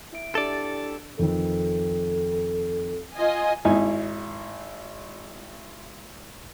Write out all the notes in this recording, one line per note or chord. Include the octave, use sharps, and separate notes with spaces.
E4 E5 D7
D4 E4 G4 A4 D5
F2 D#3 C4 A4
F4 D#5 G#5
G#1 D#4 E4 G#5